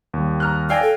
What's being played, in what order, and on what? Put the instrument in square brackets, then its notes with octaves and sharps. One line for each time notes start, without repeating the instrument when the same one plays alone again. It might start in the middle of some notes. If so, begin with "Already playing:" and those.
[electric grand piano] D#2 G3
[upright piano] A#5 F6 F#6
[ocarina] D5 [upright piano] F5 G5 G#5 [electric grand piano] E6 G#6 A#6
[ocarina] A4